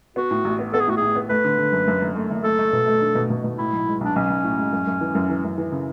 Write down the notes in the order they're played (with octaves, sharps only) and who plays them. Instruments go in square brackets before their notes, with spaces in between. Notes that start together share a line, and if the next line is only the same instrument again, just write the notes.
[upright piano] B3 [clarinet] F#4
[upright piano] A2
A1
B3
[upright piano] B3 [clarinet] A4
[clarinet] G#4
[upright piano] A2 [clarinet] F#4
[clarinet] G#4
[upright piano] A2
B3
[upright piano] A3 [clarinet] B4
[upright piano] D3
D3
F#2
F#2
F#1
A3
F#1
[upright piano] A3 [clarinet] A4
[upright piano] A3
B2
A3
D4
B2
B2
B2
[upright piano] A2 [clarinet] E4
[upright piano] B1
G#3
[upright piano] B1 [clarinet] D4
[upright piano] B1 [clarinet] C#4
[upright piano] B1
A2
G#3
F#2
F#2
E3
F#2
E3
F#2
E3
C#3